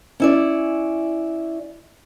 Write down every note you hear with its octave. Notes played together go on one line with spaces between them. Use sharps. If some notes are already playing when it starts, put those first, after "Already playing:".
C#4 E4 D5